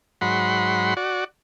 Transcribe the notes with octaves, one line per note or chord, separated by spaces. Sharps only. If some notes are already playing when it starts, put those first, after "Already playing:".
G#2 F#3 F#5 B5 C6
F#4 D5